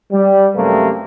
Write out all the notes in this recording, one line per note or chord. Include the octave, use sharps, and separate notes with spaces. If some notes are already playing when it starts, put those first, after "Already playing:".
G3
F#2 C3 A3 A#3 A#4 B4